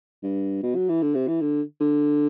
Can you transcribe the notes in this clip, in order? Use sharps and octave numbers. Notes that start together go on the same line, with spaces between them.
G2
B2
F#3
E3
D3
C3
E3
D3
D3